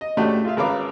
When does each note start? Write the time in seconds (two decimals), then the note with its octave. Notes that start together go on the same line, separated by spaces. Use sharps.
0.01 D#5
0.17 A2 C#3 A3 D4 F#4 G4
0.45 F4 G#4 E5 F5
0.56 G#1 C#3 A#4 B4 F5 D6